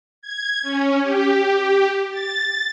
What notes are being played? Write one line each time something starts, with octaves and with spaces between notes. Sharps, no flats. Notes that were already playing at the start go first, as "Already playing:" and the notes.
G#6
C#4
G4
A6